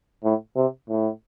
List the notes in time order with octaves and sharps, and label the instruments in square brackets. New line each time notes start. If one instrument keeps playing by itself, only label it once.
[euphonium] A2
C3
A2